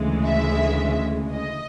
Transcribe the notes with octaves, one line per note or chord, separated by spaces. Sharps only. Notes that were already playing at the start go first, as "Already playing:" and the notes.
Already playing: D2 C#3 E3 G#3
E5
D#5